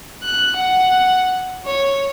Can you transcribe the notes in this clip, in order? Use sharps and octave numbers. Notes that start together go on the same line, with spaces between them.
F#6
F#5
C#5